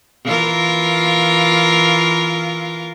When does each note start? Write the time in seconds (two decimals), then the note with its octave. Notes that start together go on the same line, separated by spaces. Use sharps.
0.25 E3 F4 A#4